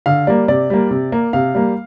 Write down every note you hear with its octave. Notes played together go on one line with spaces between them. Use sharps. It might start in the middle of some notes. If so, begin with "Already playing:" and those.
D3 F5
G3 A#3 D5
C3 D5
G3 A#3
C3
A#3
C3 F5
G3 A#3